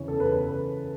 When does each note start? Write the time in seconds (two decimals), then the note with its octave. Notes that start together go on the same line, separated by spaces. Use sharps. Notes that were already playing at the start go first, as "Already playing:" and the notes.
Already playing: E2 C#3 E3 C#5
0.08 A4
0.20 E2 B4